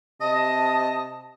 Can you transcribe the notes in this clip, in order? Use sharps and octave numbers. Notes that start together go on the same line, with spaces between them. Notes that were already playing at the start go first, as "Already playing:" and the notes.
C3 D#5 A5 D#6